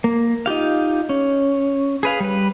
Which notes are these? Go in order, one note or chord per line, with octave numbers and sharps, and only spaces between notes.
A#3
D#4 F4 G4 F5
C#4
G#4 B4 F5
G3 B4